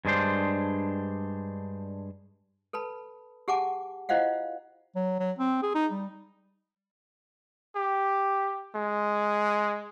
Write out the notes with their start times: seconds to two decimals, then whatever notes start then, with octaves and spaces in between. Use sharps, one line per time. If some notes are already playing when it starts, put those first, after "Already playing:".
0.05 G2 G#3 D4 C5
2.73 A4 B4 A5 B5
3.48 G4 G#4 F#5 G#5 A5 D6
4.09 E4 F4 C5 D#5 F5 F#5
4.96 F#3
5.20 F#3
5.39 C4
5.63 G#4
5.75 D#4
5.91 G3
7.76 G4
8.75 G#3